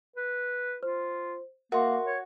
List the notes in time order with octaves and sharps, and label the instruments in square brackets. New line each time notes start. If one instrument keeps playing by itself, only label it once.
[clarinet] B4
[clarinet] F4 [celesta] C5
[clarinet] A#3 [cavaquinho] F#4 [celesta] A#4 E5 C6
[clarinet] C#5